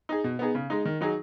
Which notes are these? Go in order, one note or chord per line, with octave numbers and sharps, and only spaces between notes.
D#4 G#4
B2
B3 D#4 G#4
C#3
G#3 D#4
D#3
F#3 D#4 G#4